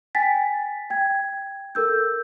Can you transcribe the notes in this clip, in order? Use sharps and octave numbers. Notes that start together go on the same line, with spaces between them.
G5 G#5 A6 B6
G5 G#6
A4 A#4 E6 G6